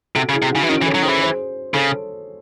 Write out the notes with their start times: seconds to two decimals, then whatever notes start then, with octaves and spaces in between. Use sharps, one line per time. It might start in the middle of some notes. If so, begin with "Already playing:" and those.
0.15 C3 F#4 A4
0.29 C#3
0.33 E4 G#4
0.42 C3
0.51 D#4 F#4
0.55 C#3
0.63 E3
0.69 D#3 C#4 E4
0.82 E3
0.86 A4 C#5
0.95 F#3
1.03 D#3 G#4 C5
1.08 E3
1.21 G#4 C5
1.74 C#3 A4 C#5